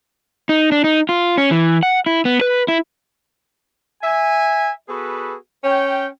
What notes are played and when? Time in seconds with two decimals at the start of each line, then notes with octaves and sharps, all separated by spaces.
0.49 D#4
0.72 D4
0.84 D#4
1.09 F4
1.38 C#4
1.51 E3
1.83 F#5
2.06 E4
2.25 B3
2.41 B4
2.68 E4
4.02 E5 G#5
4.88 B3 F#4 G#4 A4 B4
5.64 C#4 G5